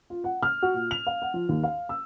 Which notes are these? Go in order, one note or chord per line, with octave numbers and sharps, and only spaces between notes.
F4
F#5
F6
F#4
A#2
F7
F5
F#5
F3
D#2
F5
E6